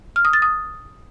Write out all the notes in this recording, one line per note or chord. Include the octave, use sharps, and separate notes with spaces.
F6
D#6
A6
D#6